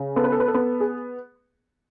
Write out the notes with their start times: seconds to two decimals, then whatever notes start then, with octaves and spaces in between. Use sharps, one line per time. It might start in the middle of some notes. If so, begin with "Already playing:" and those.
Already playing: C#3
0.16 B3 A4
0.24 B4
0.32 A4
0.40 B4
0.48 A4
0.54 B3
0.80 G#4